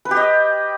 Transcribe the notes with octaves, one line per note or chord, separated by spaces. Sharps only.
B4
G4
D#5